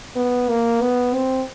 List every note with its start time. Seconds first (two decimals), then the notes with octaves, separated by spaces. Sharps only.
0.16 B3
0.49 A#3
0.82 B3
1.14 C4